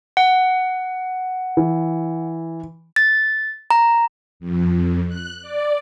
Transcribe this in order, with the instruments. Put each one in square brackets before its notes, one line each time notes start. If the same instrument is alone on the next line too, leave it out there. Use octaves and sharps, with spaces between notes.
[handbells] F#5
[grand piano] E3
[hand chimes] A6
A#5
[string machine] F2
F#6
D5